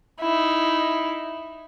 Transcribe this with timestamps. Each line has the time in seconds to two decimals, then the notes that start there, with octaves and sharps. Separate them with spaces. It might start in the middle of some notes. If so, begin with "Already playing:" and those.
0.21 D#4 E4